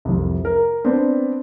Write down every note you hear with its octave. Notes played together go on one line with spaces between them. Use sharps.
C2 F2
A#4
B3 C4 D4